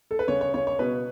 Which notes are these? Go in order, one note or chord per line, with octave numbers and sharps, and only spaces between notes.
A4
B4
C#3 C#5
C#5
C#3 C#5
C#5
B2 B4